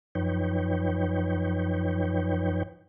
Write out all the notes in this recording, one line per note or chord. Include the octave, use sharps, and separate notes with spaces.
F#2 F3 D#4 B4 C#5 G5